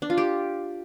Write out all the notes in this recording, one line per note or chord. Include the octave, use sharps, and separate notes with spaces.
D4
F4
G4